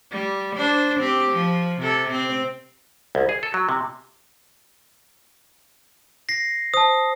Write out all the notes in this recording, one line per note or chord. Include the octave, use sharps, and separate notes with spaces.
G3
D4 C5
C4 G4
F3
C3 A4
C4
C2
G#4
A4
F#3
C3
A#6 C7
C5 A5 D#6